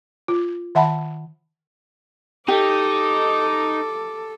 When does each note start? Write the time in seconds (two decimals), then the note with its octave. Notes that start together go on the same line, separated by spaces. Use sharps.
0.28 F4
0.75 D#3 E5 F#5 A5 B5
2.48 D#4 G4 A4 D6